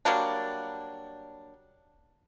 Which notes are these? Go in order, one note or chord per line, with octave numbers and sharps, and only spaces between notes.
F#3 G3 A#3 D4